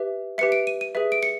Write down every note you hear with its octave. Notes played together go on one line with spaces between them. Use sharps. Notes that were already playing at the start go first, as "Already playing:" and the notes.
Already playing: G4 B4 E5
G4 B4 E5 C#7
D7
D#7
D#7
G#4 B4 E5
D7
C#7